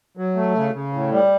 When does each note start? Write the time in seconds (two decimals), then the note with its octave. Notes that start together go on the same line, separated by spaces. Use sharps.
0.17 F#3
0.36 A3
0.55 C#3
0.74 C#3
0.93 A2
1.12 G3